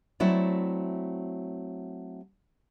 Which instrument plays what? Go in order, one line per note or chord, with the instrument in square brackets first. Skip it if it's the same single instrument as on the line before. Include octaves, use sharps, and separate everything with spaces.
[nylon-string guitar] F#3 A3 C4 E4 F#4 D5